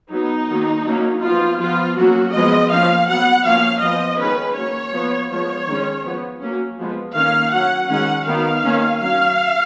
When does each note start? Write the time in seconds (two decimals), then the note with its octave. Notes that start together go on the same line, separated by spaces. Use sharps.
0.11 F#3 B3 D#4
0.49 D#3 F#3 A#3
0.86 F#3 A#3 C#4
1.23 F3 B3 F4
1.60 F3 B3 F4
1.97 F#3 A#3 C#4 F#4
2.34 F3 G#3 B3 D#5
2.71 F3 A#3 C#4 F5
3.08 F#3 B3 F#5
3.45 F3 A#3 C#4 F5
3.82 F3 B3 D#5
4.19 D#3 G#3 C#4 B4
4.56 F#3 A#3 C#4 C#5
4.93 F3 B3
5.30 F3 G#3 B3 C#5
5.67 D#3 G#3 C#4
6.04 F3 B3
6.41 F#3 A#3 C#4
6.79 F3 G#3 B3
7.15 D#3 A#3 C#4 F5
7.52 F#3 C#4 F#5
7.90 D#3 G#3 C#4 F#5
8.26 D#3 F#3 B3 F5
8.64 D#3 A#3 C#4
9.00 F#3 C#4 F5